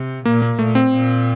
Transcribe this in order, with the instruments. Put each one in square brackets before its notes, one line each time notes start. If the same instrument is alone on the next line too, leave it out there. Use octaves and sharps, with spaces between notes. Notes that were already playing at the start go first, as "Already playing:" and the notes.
Already playing: [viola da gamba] C3
[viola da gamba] A#2 [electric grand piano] A#3
[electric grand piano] A#3
[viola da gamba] A#2 [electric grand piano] A3
[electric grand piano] C4
[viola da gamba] A#2